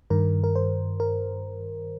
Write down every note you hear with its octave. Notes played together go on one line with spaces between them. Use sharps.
G2 D#3 A#4
A#4
C5
A#4